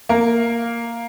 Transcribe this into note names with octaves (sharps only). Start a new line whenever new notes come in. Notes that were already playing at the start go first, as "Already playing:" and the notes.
A#3 A#4